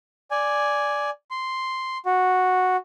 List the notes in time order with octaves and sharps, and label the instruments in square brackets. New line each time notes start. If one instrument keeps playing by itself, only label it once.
[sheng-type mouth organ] D5 G#5
C6
F#4